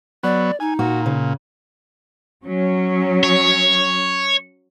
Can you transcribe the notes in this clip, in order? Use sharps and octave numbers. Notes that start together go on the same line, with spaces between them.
F#3 B3 D5
D#4 G#5
A#2 F#4
C#3
F#3 C#4
C#5